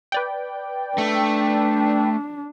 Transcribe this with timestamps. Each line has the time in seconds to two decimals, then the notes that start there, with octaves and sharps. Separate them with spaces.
0.12 B4 D5 G5
0.98 A3 D4